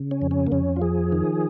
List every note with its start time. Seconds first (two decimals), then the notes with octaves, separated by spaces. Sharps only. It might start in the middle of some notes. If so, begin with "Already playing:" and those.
Already playing: C#3
0.11 C#4
0.22 F2
0.31 C#4
0.47 A#3
0.52 F2 C#4
0.76 F4
0.81 F3 G#4
1.12 D#3